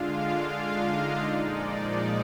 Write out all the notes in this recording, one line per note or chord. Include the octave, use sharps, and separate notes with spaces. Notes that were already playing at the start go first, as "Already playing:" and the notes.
Already playing: D3 G#3 D4 F4 F5
F4 F5
D#4 D#5
D5
A#2 F3 G#3 D#4